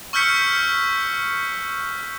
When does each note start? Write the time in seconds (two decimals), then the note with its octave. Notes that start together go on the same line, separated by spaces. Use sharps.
0.13 C#6 E6 F6 G6 B6 C#7